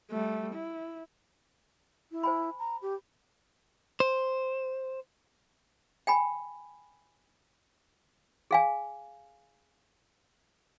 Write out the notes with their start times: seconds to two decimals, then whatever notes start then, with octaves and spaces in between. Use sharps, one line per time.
0.11 G3 A3
0.53 E4
2.12 E4
2.23 C5 G#5 B5
2.59 A#5
2.82 G4
4.00 C5
6.07 G5 G#5 B5
8.51 G#4 F5 G#5